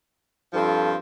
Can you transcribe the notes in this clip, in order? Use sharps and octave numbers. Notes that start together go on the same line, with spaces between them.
G2 F3 C4 F4 A4